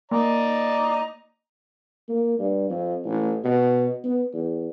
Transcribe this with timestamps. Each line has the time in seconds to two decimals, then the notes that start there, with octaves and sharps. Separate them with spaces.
0.11 A#3 D5 D#5 A#5
2.09 A#3
2.39 G2
2.70 F2
3.05 A1
3.44 B2
4.04 B3
4.34 E2